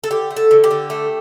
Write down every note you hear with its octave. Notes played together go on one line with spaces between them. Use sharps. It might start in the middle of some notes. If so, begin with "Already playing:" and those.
A4
D3 G4
A3
A4
D3
G4
D3
A3